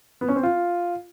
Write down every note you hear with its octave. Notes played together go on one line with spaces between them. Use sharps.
B3
C#4
C4
F4